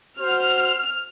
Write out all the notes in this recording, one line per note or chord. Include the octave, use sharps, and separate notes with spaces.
F#4 C5 F6